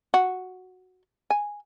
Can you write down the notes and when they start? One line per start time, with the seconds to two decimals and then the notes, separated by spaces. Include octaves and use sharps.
0.14 F#4
1.30 G#5